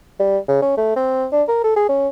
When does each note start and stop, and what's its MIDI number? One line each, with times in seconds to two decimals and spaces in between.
0.19 0.38 55
0.48 0.58 49
0.62 0.74 61
0.77 0.95 57
0.96 1.26 60
1.32 1.43 62
1.48 1.60 70
1.64 1.74 69
1.76 1.85 68
1.89 2.08 61